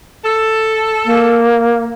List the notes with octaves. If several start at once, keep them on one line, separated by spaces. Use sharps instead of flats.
A4
A#3